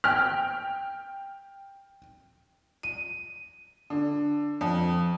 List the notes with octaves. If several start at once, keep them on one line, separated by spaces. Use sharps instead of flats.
G5 F6
D#7
D3
F2